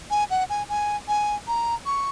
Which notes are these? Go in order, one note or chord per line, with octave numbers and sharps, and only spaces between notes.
G#5
F#5
G#5
G#5
G#5
A#5
C#6